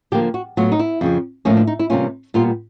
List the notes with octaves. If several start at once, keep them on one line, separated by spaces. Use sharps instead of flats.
D3 F3 A#3 G4
F#4
A2 F#3 B3 F4
D#4
E4
F2 C#3 F3
A2 F3 A#3 C#4
D4
D#4
E4
C3 E3 G3 A#3 C#4 F4
A#2 G3 B3 F4